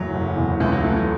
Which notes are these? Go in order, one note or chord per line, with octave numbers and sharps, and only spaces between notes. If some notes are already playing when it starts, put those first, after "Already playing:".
Already playing: F#1 E2 A2 F#3
F#1
E2
C#2 E3
F#3
E3 A3
F#3